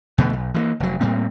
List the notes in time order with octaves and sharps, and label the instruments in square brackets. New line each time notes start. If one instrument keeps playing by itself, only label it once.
[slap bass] E2 B2 D3 A3
B1
E3 G3 A#3
F1 F#3
A2 G3 A#3 C4